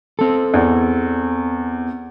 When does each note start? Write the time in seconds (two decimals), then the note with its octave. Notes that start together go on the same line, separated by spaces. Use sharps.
0.19 C4 A4
0.54 E2